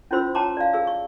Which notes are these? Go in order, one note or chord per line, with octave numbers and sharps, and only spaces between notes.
C#4 E4 F4 C5 C6 E6
C#5 G5 A5 A#5 C6 D6
D5 F5
G#4 E6
C#6